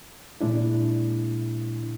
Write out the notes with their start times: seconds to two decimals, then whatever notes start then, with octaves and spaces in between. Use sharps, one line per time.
0.41 A#2 G#3 D4 E4